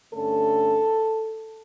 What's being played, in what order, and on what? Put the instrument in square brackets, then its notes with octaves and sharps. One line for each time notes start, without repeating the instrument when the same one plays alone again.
[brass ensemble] G2 D3 A3 C#4 A4